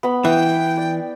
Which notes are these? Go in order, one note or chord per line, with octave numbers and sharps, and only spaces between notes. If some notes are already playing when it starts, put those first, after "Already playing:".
B3 B5 C6
E3 G5
D5